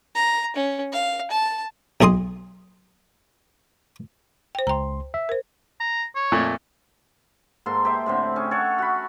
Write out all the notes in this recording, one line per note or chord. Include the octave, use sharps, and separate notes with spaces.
A#5
C#4
F5
A5
B1 G#4 D#5 C6 D#6
C5 G5
C#2 G5 A#5 C6
E5
A#4 C5
A#5
C#5
F2 A#2 A3
G#2 A#3 A4 C6
G4 C5 E5
A2 D3 C4
C#4 G#4
A4 C#5 F#5
F#4 B5